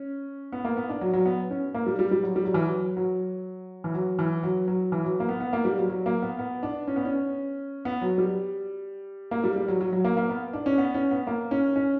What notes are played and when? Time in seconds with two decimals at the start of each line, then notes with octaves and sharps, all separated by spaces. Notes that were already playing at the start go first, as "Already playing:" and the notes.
Already playing: C#4
0.52 B3
0.65 A#3
0.77 B3
0.89 D4
1.01 F#3
1.13 F#3
1.25 B3
1.50 C#4
1.74 A#3
1.86 G3
1.99 G3
2.11 G3
2.23 F#3
2.36 G3
2.45 F#3
2.54 E3
2.64 F#3
2.97 F#3
3.84 E3
3.94 F#3
4.19 E3
4.43 F#3
4.68 F#3
4.92 E3
5.04 F#3
5.20 A#3
5.29 B3
5.40 B3
5.53 A#3
5.65 G3
5.77 F#3
5.90 F#3
6.06 A#3
6.22 B3
6.39 B3
6.63 D4
6.88 C#4
6.96 B3
7.05 C#4
7.85 B3
8.02 F#3
8.18 G3
9.31 A#3
9.44 G3
9.56 G3
9.68 F#3
9.81 F#3
9.93 F#3
10.04 A#3
10.17 A#3
10.29 B3
10.53 D4
10.66 C#4
10.78 B3
10.94 C#4
11.11 B3
11.27 A#3
11.51 C#4
11.76 C#4